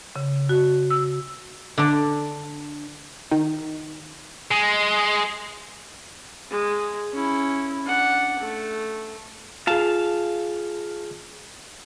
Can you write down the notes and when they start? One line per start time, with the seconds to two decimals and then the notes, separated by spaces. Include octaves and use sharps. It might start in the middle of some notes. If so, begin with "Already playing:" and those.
0.16 C#3
0.49 F#4
0.90 E6
1.78 D3 D4
3.31 D#3
4.51 G#3
6.50 G#3
7.13 C#4 E4
7.84 D4 F#5
8.39 A3
9.67 F4 G#4 F5 A5